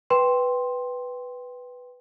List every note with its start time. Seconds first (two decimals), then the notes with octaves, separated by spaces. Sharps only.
0.10 B4 G5 C6